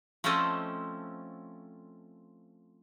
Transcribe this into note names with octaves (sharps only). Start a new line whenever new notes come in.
F3 A3 C4 C#4 A4 D#5